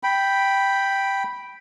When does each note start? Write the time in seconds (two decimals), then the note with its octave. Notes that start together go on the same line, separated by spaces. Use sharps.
0.03 G5 B5